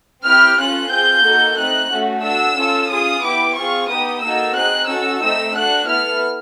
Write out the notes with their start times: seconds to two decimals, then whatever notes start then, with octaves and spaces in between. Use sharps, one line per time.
0.24 C4 E4 G4 F6
0.57 C#4 F4 A4 F#6
0.90 C4 F4 G#4 G6
1.23 A#3 D#4 F#4 A4
1.57 A3 C4 D#4 F#6
1.90 A3 C#4 F#4
2.22 D4 F#4 A4 E6
2.56 C#4 F4 A4
2.89 C#4 F4 G#4 D#6
3.22 B3 E4 G4 D6
3.55 C4 F4 G#4 C#6
3.89 B3 D#4 G4 D#6
4.22 A#3 D#4 F#4 A4 E6
4.55 C4 D#4 G#4 F#6
4.88 C#4 F#4 A4 E6
5.21 A3 C4 D#4 E6
5.55 D4 F#4 A4 F#6
5.88 B3 E4 A4 F6